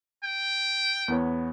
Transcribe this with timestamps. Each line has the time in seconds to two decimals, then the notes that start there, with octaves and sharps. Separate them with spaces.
0.24 G5
1.08 E2 B3 C#5